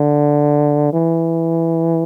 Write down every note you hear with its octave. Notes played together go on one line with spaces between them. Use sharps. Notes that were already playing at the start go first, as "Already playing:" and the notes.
Already playing: D3
E3